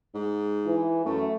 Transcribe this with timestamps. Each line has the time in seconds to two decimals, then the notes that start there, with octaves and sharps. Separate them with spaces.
0.14 G#2
0.66 E3
1.05 F#2 A3